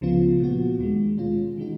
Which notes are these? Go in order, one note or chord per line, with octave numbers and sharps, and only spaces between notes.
C#2 C#3 F3 B3 F4
A#2 F3 B3 F#4
D#2 D#3 G#3
B2 G#3 C#4 F4
D#3 G#3 D#4 F#4